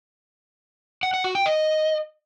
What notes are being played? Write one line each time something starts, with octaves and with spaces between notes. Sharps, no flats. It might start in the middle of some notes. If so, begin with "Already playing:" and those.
F#5
F#5
F#4
G5
D#5